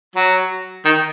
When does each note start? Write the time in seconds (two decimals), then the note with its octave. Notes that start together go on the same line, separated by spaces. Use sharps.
0.16 F#3
0.85 D#3